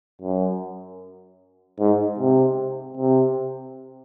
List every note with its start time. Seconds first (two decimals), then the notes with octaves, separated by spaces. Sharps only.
0.22 F#2
1.80 G#2
2.19 C3
2.97 C3